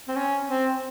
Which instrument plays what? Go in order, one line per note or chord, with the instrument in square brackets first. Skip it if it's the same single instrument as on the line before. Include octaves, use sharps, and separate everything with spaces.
[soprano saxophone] C4
C#4
C4